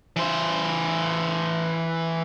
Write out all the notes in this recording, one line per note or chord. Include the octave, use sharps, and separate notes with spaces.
E3 C5